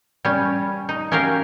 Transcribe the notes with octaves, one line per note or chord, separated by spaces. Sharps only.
G3 C#4
D#4
C#4 F#4 G4 A#4 F5